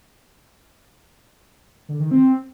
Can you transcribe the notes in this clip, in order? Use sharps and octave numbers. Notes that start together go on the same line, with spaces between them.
D3
D#3
C4